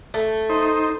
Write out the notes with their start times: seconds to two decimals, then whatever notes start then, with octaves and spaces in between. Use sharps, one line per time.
0.14 A3
0.50 D#4 C5